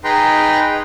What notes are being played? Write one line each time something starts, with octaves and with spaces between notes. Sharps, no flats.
D#4 G#4 B4 G5 A#5 C6